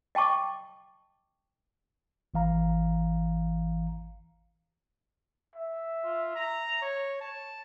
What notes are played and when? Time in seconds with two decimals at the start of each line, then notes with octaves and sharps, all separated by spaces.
0.15 D#5 G5 A5 C#6 D6
2.34 G#1 E3 F5 A#5
5.56 E5
6.04 F4
6.36 A#5
6.82 C#5
7.21 A5